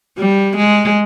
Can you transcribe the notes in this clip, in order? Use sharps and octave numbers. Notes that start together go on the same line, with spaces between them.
G3
G#3